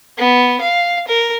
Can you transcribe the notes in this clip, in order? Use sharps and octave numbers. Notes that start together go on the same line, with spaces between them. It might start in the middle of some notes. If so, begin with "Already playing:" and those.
B3
F5
A#4